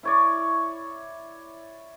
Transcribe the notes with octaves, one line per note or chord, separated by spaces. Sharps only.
E4 C#5 D5